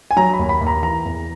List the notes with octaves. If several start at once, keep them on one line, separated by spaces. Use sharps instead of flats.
G#5
F#3 A#5
B5
D#2
B5
D#2
A#5
E3 A#5
E2